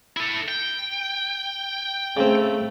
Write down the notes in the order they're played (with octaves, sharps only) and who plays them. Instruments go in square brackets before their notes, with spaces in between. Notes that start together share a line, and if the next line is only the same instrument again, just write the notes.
[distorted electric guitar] E4 A4
G5
[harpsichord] C#3 C4 [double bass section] A3